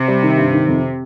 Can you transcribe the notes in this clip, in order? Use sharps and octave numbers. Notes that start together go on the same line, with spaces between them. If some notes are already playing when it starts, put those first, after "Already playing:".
Already playing: C3
G3
D#3
G2
D#3
F2